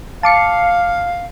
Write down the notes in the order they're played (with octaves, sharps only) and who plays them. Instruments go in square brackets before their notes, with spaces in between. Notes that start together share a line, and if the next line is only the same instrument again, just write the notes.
[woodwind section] F5 [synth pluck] A5 D6 C#7